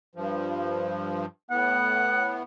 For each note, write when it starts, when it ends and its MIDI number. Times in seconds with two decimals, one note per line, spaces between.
0.15 1.26 43
0.15 1.26 53
1.51 2.43 45
1.51 2.43 59
1.51 2.36 78